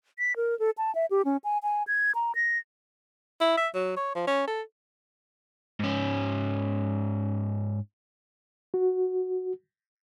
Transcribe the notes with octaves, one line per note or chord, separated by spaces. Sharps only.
B6
A#4
A4
A5
E5
G4
C#4
G#5
G#5
G#6
A#5
A#6
E4
E5
F#3
C#5
F3
C#4
A4
G#2 C#4
F#4